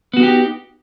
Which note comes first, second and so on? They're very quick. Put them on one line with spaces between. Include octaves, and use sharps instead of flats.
B3 F#4 D#4 G4